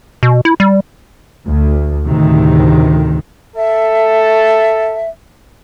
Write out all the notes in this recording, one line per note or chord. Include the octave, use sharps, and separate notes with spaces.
B2
E4
G3
D2
D2 A2 C3 D#3
A4 E5